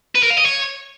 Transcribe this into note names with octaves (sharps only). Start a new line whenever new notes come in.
B4
A#4
F5
D#5
C#5